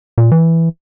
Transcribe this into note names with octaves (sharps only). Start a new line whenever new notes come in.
A#2
E3